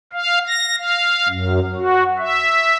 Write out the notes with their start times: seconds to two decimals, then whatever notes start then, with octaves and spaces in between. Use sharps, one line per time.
0.13 F5
0.47 A#6
0.77 F5
1.28 F#2
1.75 F#4
2.18 E5